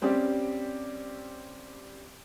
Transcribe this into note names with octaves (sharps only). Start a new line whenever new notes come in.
G3 C4 C#4 G4 D5